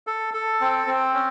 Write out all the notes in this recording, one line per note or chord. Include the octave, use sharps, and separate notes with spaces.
A4
A4
C4
C4
C#4